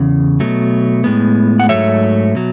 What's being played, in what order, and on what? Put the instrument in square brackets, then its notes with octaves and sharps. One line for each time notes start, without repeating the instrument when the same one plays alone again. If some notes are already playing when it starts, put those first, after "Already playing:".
Already playing: [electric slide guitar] E2 C#3
B2 F#3 A3
A2 G#3 B3
F#5
G#2 F#3 A3 C#5 E5
B2 F#3